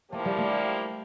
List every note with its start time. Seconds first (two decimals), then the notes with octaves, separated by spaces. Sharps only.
0.12 F3 A3 A#3 E4 G4
0.25 G3
0.38 A3